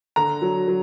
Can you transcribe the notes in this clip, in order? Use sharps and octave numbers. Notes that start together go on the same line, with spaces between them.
D3 A#5
F#3
F#3